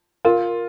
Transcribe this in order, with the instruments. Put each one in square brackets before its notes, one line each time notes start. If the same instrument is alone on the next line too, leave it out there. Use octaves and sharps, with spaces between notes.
[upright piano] F4 [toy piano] A#4